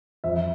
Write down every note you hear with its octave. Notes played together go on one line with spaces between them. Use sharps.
F2 E5